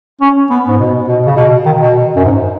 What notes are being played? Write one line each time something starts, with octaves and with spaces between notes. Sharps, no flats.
C#4
B3
G#2
B2
B2
C#3
B2
D#3
B2
F#2
G#2